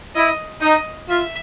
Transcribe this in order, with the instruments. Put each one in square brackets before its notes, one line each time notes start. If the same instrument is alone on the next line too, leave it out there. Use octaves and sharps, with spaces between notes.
[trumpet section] E4 [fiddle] D#5
[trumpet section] D#4 [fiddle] D#5
[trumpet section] F4 [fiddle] E5